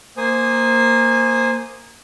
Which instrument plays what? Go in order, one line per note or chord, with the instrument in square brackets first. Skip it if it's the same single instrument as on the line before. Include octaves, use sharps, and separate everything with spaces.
[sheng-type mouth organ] A#3 C5 G#5 D#6